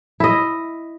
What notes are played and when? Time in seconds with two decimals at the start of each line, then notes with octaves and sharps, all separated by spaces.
0.20 E4 D#5